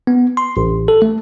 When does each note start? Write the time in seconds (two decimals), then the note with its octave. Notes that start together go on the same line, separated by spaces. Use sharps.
0.07 B3
0.37 C6
0.57 A1
0.88 A4
1.02 A3